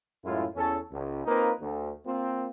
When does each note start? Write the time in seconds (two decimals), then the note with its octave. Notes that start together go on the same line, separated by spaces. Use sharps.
0.25 F#2 A2 G#3 E4 F4
0.56 E2 C#4 A4
0.92 C#2
1.25 A#3 C4 D#4 F4 A#4 B4
1.60 D2
2.06 A#3 C4 F4